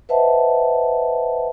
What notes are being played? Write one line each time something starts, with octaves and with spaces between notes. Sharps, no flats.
B4 C5 D#5 E5 F#5 A5